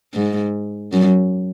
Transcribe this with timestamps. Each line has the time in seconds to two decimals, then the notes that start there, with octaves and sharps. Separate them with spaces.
0.14 G#2
0.93 F#2